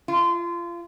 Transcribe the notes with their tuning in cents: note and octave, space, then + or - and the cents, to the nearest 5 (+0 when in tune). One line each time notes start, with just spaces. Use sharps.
F4 -25